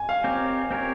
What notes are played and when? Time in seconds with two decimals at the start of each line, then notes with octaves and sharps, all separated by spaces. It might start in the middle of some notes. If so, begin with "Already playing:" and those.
Already playing: G#5
0.09 F5
0.24 C4 G4 A#4 C#5
0.71 C4 G4 A#4 C#5